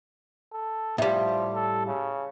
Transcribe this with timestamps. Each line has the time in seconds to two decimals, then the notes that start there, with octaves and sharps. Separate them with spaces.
0.53 A4
0.98 A2 F3 G3
1.54 A4
1.87 C#3